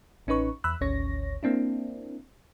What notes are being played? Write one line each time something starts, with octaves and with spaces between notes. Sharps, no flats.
A1 C#4 D#4 B4 C#6
E2 B5 E6 F#6
G#1 D2 C#4 C#5 A#6
A#3 C4 D4 E4